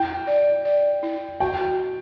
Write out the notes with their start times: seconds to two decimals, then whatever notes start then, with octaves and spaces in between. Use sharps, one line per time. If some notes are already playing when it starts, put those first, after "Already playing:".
Already playing: E4 G5
0.27 D5
0.65 D5
1.03 E4
1.40 F#4 G5